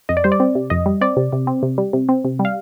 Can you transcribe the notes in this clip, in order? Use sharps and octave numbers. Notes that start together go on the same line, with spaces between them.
F2 D#5
D5
G3 C5
D5
C4
C3
F2 D#5
G3
C4 D5
C3
C3
C4
C3
G3
C3
C4
C3
G3
F5